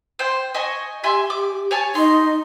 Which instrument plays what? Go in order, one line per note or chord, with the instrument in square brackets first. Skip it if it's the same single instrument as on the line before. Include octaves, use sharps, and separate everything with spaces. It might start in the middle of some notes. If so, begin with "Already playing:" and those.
[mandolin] C5 G5
D#5 G#5 C#6
[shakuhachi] G4 [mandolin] E5 G#5 C6
[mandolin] D6
C#5 G#5 A5
[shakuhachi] D#4 [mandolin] C6